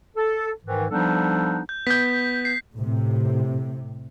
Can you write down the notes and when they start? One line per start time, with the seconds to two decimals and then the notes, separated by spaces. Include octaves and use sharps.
0.16 A4
0.65 G#2 D#3 E3
0.91 F3 G3 B3 D4 D#4 A4
1.69 G6
1.87 B3 G6 B6
2.45 C7
2.75 A2 C3